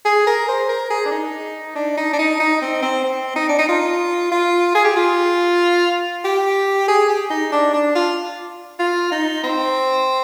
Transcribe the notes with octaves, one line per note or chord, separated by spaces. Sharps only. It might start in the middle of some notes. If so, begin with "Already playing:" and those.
G#4
A#4
C5
A#4
G#4
D4
D#4
D4
D#4
D4
D#4
D#4
C4
C4
C4
D#4
D4
D#4
F4
F4
G#4
G4
F4
G4
G#4
G4
D#4
D4
D4
F4
F4
D#4
C4